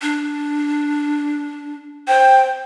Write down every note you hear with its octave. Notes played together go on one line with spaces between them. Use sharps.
D4
C5 G5